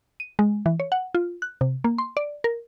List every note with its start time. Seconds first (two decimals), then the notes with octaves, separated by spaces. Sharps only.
0.20 D#7
0.39 G#3
0.66 E3
0.80 C#5
0.92 F#5
1.15 F4
1.42 F#6
1.61 C3
1.84 A#3
1.98 C6
2.17 D5
2.44 A#4